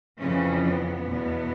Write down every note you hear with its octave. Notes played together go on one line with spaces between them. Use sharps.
F2 C#3 E3 C#4
B3
E2 B2